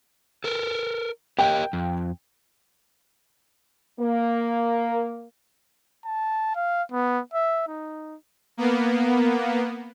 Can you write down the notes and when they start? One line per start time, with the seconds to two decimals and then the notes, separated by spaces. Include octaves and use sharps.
0.44 A4 A#4
1.39 G4 A#4 D#5 G5
1.73 F2
4.00 A#3
6.05 A5
6.55 F5
6.92 B3
7.34 E5
7.68 D#4
8.57 A#3 B3